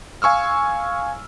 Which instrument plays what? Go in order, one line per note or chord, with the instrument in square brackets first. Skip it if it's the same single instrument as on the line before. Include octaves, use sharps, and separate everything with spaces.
[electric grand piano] F5 G#5 C#6 E6 F6